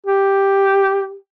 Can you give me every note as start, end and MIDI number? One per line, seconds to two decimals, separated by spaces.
0.06 1.16 67